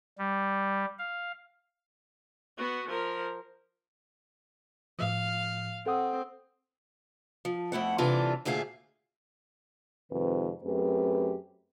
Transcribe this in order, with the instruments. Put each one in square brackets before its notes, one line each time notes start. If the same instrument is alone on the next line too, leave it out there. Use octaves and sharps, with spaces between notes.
[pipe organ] G3
F5
[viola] B3 F#4
F3 A#4
[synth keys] A2 F3 [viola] F5
[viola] C4 [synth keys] A4 F#5 D#6
[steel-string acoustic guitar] F3
F2 A3 E4 F#5
C3 E3 G3 D4 F4 A4
D2 A#2 A3 G#4 F5
[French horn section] F2 C3 D#3 G#3 B4
F#2 A3 C4 G4 G#4 B4